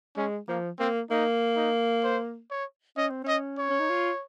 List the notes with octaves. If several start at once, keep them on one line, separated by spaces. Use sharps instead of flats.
G#3 C#4
F3 A#3
A#3 C4
A#3 D#4
D#4
C5
C#5
C#4 D#5
C4
C#4 D#5
C#5
C#4
D#4
F4